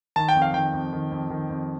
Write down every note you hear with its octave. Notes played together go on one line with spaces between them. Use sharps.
D#3 A5
G5
F2
F5
D#3 G5
F2
D#3
F2
D#3
F2